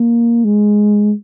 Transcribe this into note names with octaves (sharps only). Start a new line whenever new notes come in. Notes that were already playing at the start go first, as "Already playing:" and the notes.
Already playing: A#3
G#3